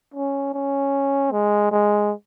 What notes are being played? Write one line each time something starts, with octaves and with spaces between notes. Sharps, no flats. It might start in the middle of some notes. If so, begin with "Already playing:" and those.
C#4
C#4
G#3
G#3